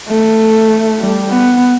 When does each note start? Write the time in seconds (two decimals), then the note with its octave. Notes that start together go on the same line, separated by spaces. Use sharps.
0.09 A3
1.00 G3
1.30 B3